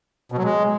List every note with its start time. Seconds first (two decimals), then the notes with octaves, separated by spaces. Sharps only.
0.32 B2
0.38 F#3
0.44 G#3